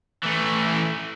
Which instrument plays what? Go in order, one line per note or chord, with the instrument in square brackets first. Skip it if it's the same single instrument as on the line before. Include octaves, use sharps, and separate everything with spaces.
[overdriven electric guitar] E3 A3